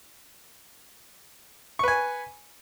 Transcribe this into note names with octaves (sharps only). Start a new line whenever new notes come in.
B4 G#5 C#6